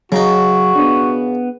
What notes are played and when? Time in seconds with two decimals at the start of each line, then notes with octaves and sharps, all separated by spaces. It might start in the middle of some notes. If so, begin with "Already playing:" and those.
0.12 C#3 F#3 D#4 F#4 A#5
0.76 B3 D4